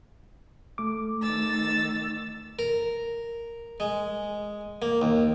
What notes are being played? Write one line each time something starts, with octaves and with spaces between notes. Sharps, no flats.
A3 D6
D#3 E6 A6
A#4
G#3
A#3
D#2